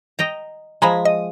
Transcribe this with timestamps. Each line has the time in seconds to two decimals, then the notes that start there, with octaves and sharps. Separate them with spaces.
0.19 D#5 G5 A#5
0.82 F3 G#3 G#5 A#5 B5
1.05 D#5